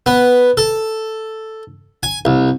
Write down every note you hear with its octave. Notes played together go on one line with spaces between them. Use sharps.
B3
A4
G#5
C2